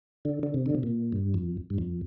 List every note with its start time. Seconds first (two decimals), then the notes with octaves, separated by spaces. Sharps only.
0.25 D3
0.43 D3
0.54 C3
0.66 D3
0.75 C3
0.83 A#2
1.12 G2
1.34 F2
1.70 G2
1.78 F2